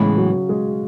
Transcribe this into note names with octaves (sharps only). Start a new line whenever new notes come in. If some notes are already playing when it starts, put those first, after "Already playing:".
Already playing: A2 C#3 E3 G#3 B3 C#4
F#3 F#4
G#3 G#4